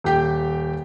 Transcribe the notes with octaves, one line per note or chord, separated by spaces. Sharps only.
D#1 G4 G5